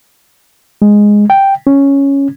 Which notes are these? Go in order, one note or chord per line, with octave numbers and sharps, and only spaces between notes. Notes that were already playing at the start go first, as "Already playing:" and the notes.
G#3
G5
C#4